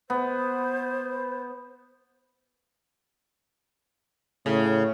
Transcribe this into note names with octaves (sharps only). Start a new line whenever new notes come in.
B3 C5
A2 C#3